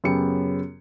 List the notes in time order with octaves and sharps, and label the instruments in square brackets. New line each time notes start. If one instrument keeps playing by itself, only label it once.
[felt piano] F#2 C#3 B3 G4 C#7